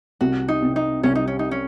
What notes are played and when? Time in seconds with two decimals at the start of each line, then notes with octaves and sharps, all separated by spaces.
0.21 C2 F#4
0.48 D#4
0.62 C3
0.76 D#4
1.03 C2 C#4
1.15 D#4
1.28 C#4
1.39 D#4
1.51 C#4